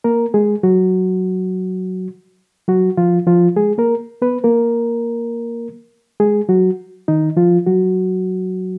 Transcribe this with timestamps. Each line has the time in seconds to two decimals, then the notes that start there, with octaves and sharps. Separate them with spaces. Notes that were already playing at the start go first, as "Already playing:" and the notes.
0.04 A#3 A#4
0.34 G#3 G#4
0.63 F#3 F#4
2.68 F#3 F#4
2.97 F3 F4
3.27 F3 F4
3.56 G#3 G#4
3.78 A#3 A#4
4.22 B3 B4
4.44 A#3 A#4
6.20 G#3 G#4
6.49 F#3 F#4
7.08 D#3 D#4
7.37 F3 F4
7.66 F#3 F#4